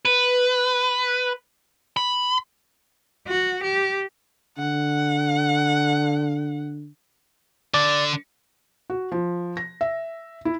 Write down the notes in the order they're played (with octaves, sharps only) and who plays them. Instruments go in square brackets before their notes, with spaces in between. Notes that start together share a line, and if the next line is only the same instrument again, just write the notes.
[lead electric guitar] B4
B5
[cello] F#4
G4
[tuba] D3 [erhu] F#5
[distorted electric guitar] D3 [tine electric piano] D5
[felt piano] F#4
F3
A#6
E5
E4